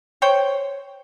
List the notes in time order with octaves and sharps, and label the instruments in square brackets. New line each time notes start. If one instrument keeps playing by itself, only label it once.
[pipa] C5 C#5 G5